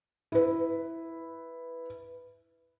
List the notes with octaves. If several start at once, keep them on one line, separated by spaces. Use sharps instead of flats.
E4 B4